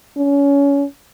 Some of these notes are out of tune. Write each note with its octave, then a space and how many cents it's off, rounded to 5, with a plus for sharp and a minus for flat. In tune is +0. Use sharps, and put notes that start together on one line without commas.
C#4 +25